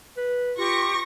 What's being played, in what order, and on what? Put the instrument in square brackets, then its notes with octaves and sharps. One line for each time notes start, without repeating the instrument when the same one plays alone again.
[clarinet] B4
[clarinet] F4 [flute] G4 [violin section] C#6 A#6